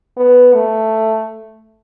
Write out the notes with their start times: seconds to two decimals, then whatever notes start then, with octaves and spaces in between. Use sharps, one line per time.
0.17 B3
0.54 A3